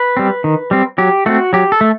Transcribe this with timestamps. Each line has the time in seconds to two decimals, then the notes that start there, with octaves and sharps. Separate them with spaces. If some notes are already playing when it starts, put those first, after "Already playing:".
Already playing: B4
0.17 G3 C4
0.44 D#3
0.71 G3 C4
0.98 F#3 G4
1.26 A3 C4 F#4
1.53 F#3 G4
1.72 A4
1.81 A3